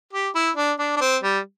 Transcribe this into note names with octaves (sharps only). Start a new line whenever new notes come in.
G4
E4
D4
D4
D4
C4
G3